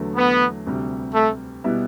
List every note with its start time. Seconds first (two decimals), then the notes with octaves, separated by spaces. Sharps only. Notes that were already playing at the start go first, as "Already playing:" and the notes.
Already playing: E2 D3 F#3 A3
0.16 B3
0.67 D2 C3 G3
1.15 A3
1.64 B2 G3 B3 E4